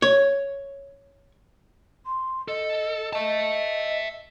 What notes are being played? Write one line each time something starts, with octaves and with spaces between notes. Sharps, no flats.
C#5
C6
A4 D#5
D#5 E5 A5